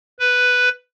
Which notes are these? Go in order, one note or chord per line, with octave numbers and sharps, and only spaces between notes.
B4